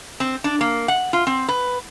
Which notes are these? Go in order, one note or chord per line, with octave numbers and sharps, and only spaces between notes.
C4
D4
A#3
F#5
F4
C4
B4